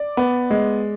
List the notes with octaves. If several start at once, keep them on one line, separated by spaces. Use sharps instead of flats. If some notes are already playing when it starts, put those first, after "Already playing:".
Already playing: D5
B3
G#3